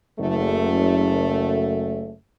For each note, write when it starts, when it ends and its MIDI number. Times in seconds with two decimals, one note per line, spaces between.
0.19 2.12 30
0.19 2.12 42
0.19 2.12 57